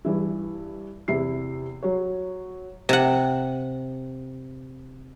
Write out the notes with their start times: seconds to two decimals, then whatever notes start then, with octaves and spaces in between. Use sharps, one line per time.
0.05 G2 E3 E4
1.08 E2 C3 E4 C7
1.83 F#3 C#5
2.89 C3 F#5